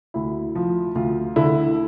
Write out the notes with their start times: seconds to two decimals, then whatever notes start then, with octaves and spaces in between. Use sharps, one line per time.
0.14 D2 E4
0.55 F3
0.95 D2 F4
1.36 D3 E4